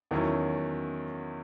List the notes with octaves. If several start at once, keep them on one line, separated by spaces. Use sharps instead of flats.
E2 D#3 F#3 C#4 E4